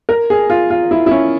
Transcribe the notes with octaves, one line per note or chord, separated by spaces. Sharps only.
A#4
G#4
F4
F4
E4
E4
C#4